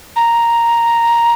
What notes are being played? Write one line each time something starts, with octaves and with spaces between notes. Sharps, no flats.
A#5